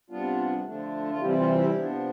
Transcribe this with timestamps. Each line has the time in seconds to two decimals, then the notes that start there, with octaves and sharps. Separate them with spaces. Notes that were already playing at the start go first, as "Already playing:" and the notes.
0.10 C3 G3 B3 D4 F4
0.66 D3 F3 A3 D4
1.09 F4
1.21 C3 E3 G3 C4 E4 G4
1.40 F4
1.58 E4 G4
1.76 C3 F3 B3 D4